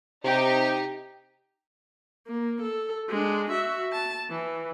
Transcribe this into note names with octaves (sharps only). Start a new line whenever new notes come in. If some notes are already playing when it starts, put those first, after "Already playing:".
C3 D#4 G4
A#3
A4
G#3 D4
F#4 E5
A5
E3